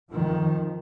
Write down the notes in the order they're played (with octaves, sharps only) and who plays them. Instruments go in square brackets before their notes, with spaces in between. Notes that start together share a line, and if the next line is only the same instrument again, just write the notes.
[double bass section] F2 D#3 F3